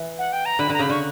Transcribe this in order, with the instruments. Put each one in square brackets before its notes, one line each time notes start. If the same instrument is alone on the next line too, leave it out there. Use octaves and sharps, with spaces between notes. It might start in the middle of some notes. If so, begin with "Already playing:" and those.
Already playing: [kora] E3
[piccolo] F#5
G5
A#5
[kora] D3 [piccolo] B5
[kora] D3 [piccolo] A#5
[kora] C#3 [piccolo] B5
[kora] D3 [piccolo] C#6